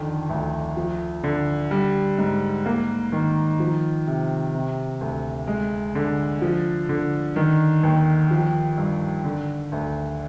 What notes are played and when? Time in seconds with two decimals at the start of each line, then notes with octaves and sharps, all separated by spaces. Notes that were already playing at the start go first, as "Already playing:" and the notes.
Already playing: F2 D3 D#3
0.30 D2
0.77 F3
1.24 D3
1.71 G3
2.18 G#2
2.66 A#3
3.12 D#3
3.60 F3
4.07 C3
4.53 C3
5.01 D2
5.47 G#3
5.95 D3
6.42 F3
6.89 D3
7.36 D#3
7.83 D#2
8.31 F3
8.77 G2
9.25 D3
9.72 D2